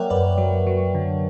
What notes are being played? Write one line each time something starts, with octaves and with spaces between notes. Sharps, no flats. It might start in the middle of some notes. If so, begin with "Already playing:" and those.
Already playing: F#3 A#3 A#4 C#5 D5 E5 F#5 G5
F#2 B4 D5
F#3
F#3
D3